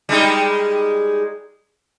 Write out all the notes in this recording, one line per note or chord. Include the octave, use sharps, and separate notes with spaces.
G3 G#3 D#4